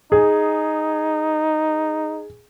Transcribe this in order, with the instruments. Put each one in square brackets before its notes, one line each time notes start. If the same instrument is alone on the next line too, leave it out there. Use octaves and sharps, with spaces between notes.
[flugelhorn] D#4 [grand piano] G#4